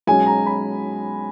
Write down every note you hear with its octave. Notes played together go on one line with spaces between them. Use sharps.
B1 B2 G#3 C#4 G#5
A#5
B5